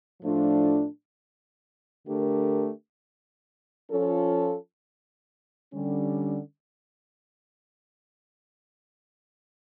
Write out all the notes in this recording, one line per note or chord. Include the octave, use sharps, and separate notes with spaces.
A2 F3 A3 D4 F4
D3 A3 D4 G4 A#4
F3 C#4 F4 A4
D3 G3 C#4